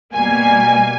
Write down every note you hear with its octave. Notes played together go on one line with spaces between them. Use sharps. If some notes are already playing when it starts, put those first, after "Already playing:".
B2 G3 A#3 G#5